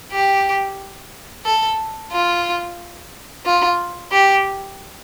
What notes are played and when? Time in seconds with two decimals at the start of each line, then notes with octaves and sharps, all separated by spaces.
0.12 G4
1.45 A4
2.12 F4
3.46 F4
4.12 G4